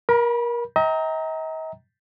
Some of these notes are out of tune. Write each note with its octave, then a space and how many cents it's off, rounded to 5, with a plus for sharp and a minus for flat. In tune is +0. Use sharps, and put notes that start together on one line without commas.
A#4 +25 B5 -30
D#5 +45 G5 +0 A#5 +0